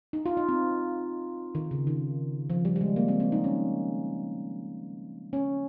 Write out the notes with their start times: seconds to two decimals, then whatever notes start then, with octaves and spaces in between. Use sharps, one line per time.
0.13 D#4
0.26 F4
0.37 D#4
0.49 C4
1.55 D#3
1.71 C#3
1.87 D#3
2.50 F3
2.65 G3
2.76 G3
2.81 G#3
2.96 A#3
3.08 C4
3.20 C4
3.32 D#4
3.44 C#4
5.33 C#4